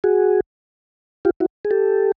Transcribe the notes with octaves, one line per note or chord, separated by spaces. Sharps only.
F#4 G#4
F4 G4
E4 F#4
G#4
G4 A4